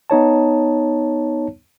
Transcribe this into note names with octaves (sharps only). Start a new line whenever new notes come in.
B3 D#4 C#5 A5